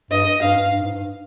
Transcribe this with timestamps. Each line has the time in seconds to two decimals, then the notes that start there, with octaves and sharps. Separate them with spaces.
0.11 G2 D#5
0.43 G2 F5
0.57 G2
0.74 G2
0.83 G#2
0.93 G2